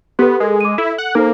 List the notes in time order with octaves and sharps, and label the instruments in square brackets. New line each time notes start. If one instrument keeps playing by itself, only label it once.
[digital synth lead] B3 [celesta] G4 A4 B4
[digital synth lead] G#3 [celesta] A4 A#4
[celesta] D6 D#7
[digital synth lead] E4 [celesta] A4
[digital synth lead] F#5
[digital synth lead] A#3 [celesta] D#4 A4 C5